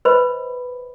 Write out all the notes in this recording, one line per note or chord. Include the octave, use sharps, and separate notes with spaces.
B4 C5 D#5 B5